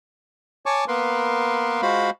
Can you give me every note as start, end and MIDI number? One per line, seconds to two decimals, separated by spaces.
0.66 0.85 73
0.66 0.85 80
0.66 0.85 81
0.66 0.85 85
0.66 0.85 86
0.88 1.81 58
0.88 1.81 59
0.88 1.81 70
0.88 1.81 71
0.88 1.81 84
1.82 2.10 56
1.82 2.10 65
1.82 2.10 66
1.82 2.10 72
1.82 2.10 77
1.82 2.10 83